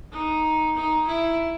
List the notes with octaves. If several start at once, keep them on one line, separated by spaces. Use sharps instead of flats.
D#4
D#4
E4